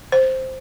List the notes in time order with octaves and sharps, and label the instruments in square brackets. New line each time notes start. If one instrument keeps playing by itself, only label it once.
[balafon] C5